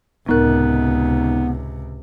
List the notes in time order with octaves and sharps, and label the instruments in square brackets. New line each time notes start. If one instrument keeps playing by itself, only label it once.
[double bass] C#2 C3 [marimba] A2 A#4 [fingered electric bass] B3 [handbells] D#4 F#6